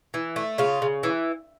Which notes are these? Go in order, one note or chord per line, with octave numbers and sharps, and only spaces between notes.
E3
A3
C#3 F4
C#3
E3